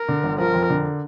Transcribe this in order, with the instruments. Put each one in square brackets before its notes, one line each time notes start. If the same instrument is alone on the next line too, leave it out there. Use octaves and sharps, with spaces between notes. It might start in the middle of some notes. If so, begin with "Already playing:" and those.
Already playing: [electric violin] A#4
[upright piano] D3
G1
[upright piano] F3 [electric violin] A#4
[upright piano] F2
D3